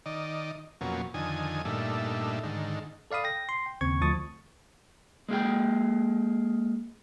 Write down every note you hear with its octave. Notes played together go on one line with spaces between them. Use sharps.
D#3 D5 D#5
F2 B2 F#3 A#3 C#4
F2 D3 D#3 G#5 D#6
G2 A#2 A3 D4 D#4 E5
G#2 D3 D#3
A4 D5 F5 B5 D#6
G5 A#6
C6
G5
D#2 C#3 C4 C#6 G#6
D2 F3 A5 C#6 D#6 A6
G#3 A#3 G#4 G5